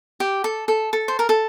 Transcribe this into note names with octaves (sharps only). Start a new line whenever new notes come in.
G4
A4
A4
A4
C5
A#4
A4